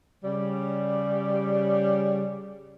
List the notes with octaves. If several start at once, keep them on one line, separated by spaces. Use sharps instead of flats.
C#3 G3